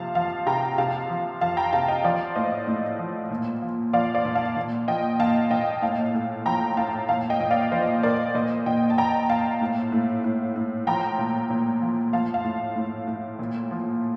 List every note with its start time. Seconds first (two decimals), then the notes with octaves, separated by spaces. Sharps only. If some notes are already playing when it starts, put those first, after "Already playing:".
Already playing: C3 F3 F5 A5
0.15 F3 F5 A5
0.47 C3 G5 A#5
0.78 C3 F5 A5
1.10 F3
1.41 F3 F5 A5
1.57 G5 A#5
1.73 C3 F5 A5
1.88 D#5 G5
2.04 F3 D5 F5
2.36 A2 C5 D#5
2.67 A2
2.99 F3
3.31 A#2
3.62 F3
3.93 F3 D5 F5
4.15 D5 F5
4.25 A#2
4.35 F5 A5
4.57 A#2
4.88 F3 D#5 G5
5.20 A#2 F5 A5
5.51 A#2 D#5 G5
5.82 A2 F5 A5
6.14 A2
6.46 F3 G5 A#5
6.77 A2 F5 A5
7.09 A#2 F5 A5
7.30 D#5 G5
7.40 A#2
7.51 D5 F5
7.72 F3 C5 D#5
8.03 A#2 A#4 D5
8.35 A#2 C5 D#5
8.66 A#2 D#5 G5
8.90 A5
8.97 A#2 G5 A#5
9.29 A#2 F5 A5
9.61 A2
9.92 A2
10.24 A2
10.56 A2
10.87 F3 G5 A#5
11.18 A#2
11.50 A#2
11.82 F3
12.13 F3 F5 A5
12.34 F5 A5
12.44 A2
12.76 A2
13.07 A2
13.39 A#2
13.71 F3